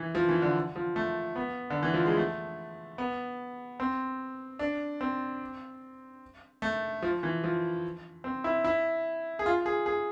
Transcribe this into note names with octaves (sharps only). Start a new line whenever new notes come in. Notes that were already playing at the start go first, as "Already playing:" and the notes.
Already playing: E3
F3
E3
D3
F3
A3
B3
D3
E3
F3
G#3
A3
B3
C4
D4
C4
A3
F3
E3
F3
C4
E4
E4
G#4
F4
G#4
G#4